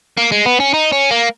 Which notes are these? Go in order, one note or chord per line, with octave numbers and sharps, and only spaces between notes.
A#3
G#3
B3
C#4
D#4
C#4
A#3